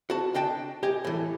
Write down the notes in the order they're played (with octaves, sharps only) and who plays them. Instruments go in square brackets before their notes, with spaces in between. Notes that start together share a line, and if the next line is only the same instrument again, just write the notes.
[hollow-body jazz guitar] F#4 A5
D4 D#5 G5 A5
G4 D#5 G#5
A2 E3